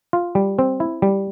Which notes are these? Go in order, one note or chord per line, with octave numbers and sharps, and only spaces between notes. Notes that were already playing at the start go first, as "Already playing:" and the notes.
F4
G3
C4
E4
G3